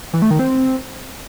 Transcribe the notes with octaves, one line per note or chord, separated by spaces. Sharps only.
E3
A3
D#3
C4